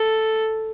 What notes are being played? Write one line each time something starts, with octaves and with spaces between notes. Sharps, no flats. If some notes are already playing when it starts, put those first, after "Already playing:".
Already playing: A4